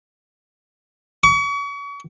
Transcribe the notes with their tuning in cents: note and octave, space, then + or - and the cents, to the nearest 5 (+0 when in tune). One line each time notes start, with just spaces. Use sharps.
C#6 +40